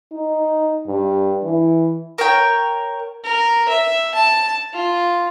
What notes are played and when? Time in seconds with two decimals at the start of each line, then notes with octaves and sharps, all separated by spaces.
0.12 D#4
0.87 G2
1.44 E3
2.18 A#4 C#5 G5
3.24 A#4
3.69 E5
4.15 A5
4.73 F4